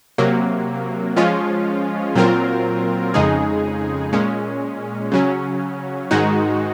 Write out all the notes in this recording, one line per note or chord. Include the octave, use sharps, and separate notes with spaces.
C3 F#3 A#3
F3 G#3 C#4 F4
A#2 F#3 C4 F4 A#4
F2 C#3 G#3 D#4 G#4
A#2 G#3 C#4
C#3 F#3 C#4
G#2 D#3 G#3 D#4 F#4